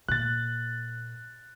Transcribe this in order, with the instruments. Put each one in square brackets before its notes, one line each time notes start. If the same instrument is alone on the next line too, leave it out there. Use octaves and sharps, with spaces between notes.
[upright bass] A#2 [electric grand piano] F#6 A6